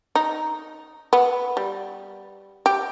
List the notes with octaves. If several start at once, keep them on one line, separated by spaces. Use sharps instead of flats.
D#4
B3
G3
G4